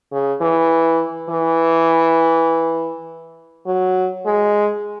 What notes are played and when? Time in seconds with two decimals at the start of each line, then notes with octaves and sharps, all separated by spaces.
0.12 C#3
0.41 E3
1.30 E3
3.66 F#3
4.26 G#3